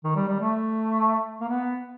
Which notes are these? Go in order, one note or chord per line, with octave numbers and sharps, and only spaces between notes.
D#3
G3
G3
A3
A#3
B3